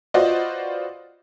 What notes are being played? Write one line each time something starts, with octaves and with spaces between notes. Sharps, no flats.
F4 F#4 B4 C5 D5 D#5